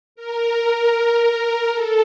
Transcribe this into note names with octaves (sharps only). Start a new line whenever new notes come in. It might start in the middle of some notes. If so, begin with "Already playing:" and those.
A#4
A4